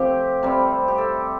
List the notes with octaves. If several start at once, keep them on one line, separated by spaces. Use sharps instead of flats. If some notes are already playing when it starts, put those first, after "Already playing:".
Already playing: C3 F3 A3 C4 G4
C3 G3 C4
G4
A4